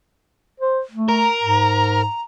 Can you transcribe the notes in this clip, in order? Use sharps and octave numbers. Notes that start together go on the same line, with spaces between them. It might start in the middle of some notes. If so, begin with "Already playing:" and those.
C5
A3
A#4 A#5
G#2